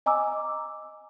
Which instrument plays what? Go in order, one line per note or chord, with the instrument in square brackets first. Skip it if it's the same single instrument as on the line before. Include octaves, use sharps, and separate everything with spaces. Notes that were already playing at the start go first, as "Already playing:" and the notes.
[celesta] D#5 G#5 A#5 D6 E6